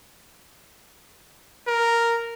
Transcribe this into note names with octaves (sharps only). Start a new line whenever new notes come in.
A#4